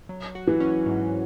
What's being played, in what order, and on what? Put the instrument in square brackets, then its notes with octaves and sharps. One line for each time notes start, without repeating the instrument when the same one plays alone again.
[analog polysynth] F#3
F#4
[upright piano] E3
[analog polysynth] C#4
G#2